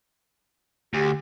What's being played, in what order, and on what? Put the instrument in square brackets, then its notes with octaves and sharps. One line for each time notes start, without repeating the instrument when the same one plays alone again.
[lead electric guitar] D2 [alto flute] G4